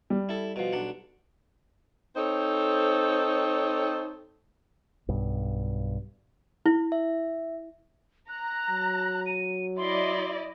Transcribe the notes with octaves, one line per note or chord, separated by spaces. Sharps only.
G3
E4 A4
B2 F3
B1 D4 F#5
C4 D#4 A4 C5 C#5
B1 G2
E4
E5
A#5 F#6
F#3
D#7
E4 D5 D#5 C6